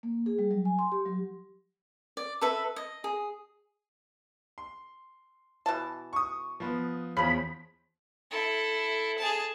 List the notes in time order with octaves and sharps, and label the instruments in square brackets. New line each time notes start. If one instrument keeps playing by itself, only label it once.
[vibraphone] A#3
G#4
G3
F#3
G#5
C6
G4
F#3
[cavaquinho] D5
A4 B4 E5
D#5
G#4
[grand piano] C6
[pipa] B2 E3 A5
[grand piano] C#6 D#6
F3 B3
[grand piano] E2 [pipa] C#3 F3 [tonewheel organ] B5
[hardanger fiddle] E4 A4
G#4 A5